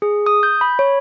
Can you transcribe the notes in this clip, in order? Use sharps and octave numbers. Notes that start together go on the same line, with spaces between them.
G#4
D#6
G6
B5
C#5